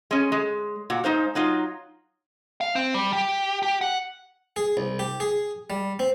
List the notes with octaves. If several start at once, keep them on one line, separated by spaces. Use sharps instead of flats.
G#3 C#4
G#3
A#2 F#4
G#3 D#4 C5 F5
F#3 D#4 F4
F5
C4
G3
G4
G4
F#5
G#4
C2
G4
G#4
G3
C4